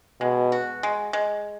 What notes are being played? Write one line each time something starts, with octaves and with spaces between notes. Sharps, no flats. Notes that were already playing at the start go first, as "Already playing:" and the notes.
B2 G#3
F#4
G#3
G#3